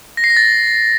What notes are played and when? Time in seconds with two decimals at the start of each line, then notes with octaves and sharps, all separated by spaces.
0.17 A#6
0.24 C7
0.30 A#6
0.37 A6